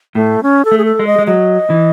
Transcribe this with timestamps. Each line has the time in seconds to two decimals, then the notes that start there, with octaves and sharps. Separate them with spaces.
0.15 A2 A3
0.43 C#4
0.65 A4
0.71 A3
0.78 G#4
0.85 A4
0.99 G#3
1.07 D#5
1.19 G#3
1.27 F#3 D#5
1.70 E3